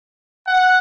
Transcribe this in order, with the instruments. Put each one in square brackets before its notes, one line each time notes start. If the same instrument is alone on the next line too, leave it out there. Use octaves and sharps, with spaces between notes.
[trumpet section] F#5